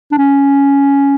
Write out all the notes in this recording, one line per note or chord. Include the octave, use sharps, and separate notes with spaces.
D4
C#4